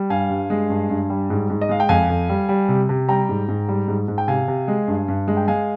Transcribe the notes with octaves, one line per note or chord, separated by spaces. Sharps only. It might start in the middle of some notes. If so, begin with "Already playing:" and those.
Already playing: G3
G2 F5 G#5
G2
G#3
G2
G2
G3
G#2
G#2
D#5
G#3 F5
G5
F2 F5 G#5
F2
G3
G3
C3
C3
G3 G5 A#5
G#2
G#2
G3
G#2
G#2
G5
C3 F5 G#5
C3
G#3
G2
G2
G#3
G5
G#3 F5 G#5